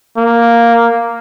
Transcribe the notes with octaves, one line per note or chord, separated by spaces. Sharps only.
A#3